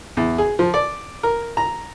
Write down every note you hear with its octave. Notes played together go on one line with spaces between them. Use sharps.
E2
G#4
F3
D5
A#4
A#5